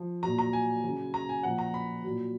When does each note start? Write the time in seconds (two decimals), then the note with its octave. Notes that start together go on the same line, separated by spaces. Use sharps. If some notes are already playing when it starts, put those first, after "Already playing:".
Already playing: F3
0.23 A#2 F#3 A#5
0.39 A#5
0.53 G#5
0.83 C#3 F#3
1.14 A#5
1.29 G#5
1.43 A#2 F3 F#5
1.59 A#5
1.74 B5
2.04 A#2 F#3